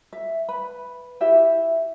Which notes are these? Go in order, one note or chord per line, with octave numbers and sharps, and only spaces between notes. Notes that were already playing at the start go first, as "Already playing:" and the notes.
E5
B4 B5
E4 G4 E5